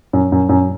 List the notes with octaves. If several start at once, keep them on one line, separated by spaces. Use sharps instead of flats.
F#2
F#2
F#2